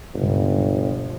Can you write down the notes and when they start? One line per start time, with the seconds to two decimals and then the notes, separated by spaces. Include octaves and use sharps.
0.14 G1 C#2 G2 B2
0.70 F3